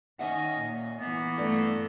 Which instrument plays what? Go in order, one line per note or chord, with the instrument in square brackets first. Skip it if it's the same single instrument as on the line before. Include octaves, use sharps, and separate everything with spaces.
[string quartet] D#3 C#4 D#5 [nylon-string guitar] E5 F#5
[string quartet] A#2
[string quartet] E3 A#3 [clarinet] B3
[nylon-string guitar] G2 [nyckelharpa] A3